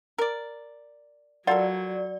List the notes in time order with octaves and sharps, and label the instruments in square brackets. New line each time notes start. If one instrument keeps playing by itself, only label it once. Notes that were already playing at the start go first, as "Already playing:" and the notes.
[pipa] A#4 D5
[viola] F#3 [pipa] F4 A4 A#4 [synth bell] D5 [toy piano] F#5